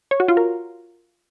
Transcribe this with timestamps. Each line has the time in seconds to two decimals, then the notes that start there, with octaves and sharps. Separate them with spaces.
0.11 C#5
0.20 F#4
0.28 F4
0.37 A#4